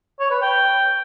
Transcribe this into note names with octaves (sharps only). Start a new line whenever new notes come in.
C#5
B4
G5